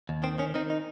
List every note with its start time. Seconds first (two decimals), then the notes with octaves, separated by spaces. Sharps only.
0.09 D#2
0.23 D#3 C4
0.38 D#3 C#4
0.54 D#3 C4 D#4
0.70 D#4